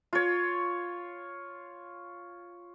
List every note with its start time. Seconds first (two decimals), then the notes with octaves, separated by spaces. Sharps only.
0.13 F4 C#5